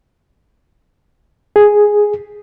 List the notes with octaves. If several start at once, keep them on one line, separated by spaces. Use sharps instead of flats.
G#4